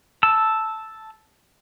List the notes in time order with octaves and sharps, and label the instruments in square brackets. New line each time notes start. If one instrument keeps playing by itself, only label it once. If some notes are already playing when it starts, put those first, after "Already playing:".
[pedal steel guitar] A5 E6